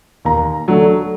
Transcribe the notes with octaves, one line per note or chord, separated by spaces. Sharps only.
D#2 A#5
D3 F#3 A3